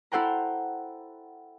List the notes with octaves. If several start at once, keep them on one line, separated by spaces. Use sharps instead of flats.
E4 A4 C5 F#5 G5 A#5